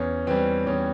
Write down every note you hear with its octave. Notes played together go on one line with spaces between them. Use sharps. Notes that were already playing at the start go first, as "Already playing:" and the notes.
Already playing: E2 C#4
E3 G3 C4
E2 C#4